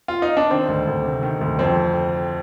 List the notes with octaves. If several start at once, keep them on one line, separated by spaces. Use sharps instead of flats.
F4
D#4
D4
D#3 C4
D2
D2
C3
D#3
D2
F2 C4